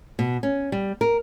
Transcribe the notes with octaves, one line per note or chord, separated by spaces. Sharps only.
B2
C#4
G3
A#4